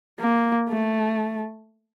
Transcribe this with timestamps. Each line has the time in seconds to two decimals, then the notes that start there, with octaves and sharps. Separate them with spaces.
0.20 A#3
0.69 A3